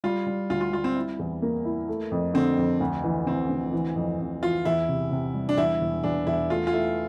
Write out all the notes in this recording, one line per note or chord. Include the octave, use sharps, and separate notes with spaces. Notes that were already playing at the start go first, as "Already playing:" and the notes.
G3 F4
G3
D2 F4
F4
G3 F4
C4
E4
E2
A#3
E4
A3
F2
D3 C4
F2
D2
E3
D2 C4
D2
E3
F2
F2
E3 F4
E2 E4
C3
C3
G3
D4
E2 E4
E1
E2 D4
E2 E4
A3 F4
F4
A3 E4